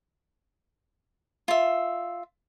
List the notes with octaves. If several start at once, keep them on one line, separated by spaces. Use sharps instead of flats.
F4 E5